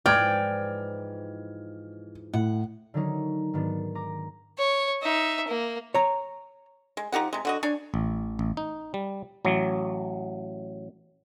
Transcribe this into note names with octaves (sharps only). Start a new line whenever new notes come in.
G#2 E3 F3 D5 G5 F6 G#6
A2 F#5
D3 D#3 F#3 C#4 D#4
G#2 D#3 B3 D4 F#4
A#5 D6 A#6
C#5
D#4 E5
A#3
C#5 A#5
G#3
F3 D#4 G4 F#5
C3 G#3
D3 F#4 D#5
D4 C#5 G#5
A1
A1
D#4
G3
A1 F#3